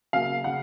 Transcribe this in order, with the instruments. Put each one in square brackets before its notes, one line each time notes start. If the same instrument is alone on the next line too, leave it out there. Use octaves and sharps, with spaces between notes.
[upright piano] C#3 F#3 A#3 F5
C#3 F#5